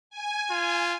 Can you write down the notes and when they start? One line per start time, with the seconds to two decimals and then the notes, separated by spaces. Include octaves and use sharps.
0.10 G#5
0.50 F4